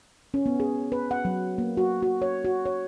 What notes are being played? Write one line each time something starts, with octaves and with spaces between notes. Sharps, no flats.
C#4
B3
G#4
B4
F#5
F#3
A#3
F#4
F#4
C#5
F#4
C#5